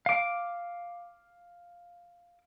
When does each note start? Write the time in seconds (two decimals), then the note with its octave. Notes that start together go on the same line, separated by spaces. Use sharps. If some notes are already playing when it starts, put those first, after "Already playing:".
0.06 F5 D6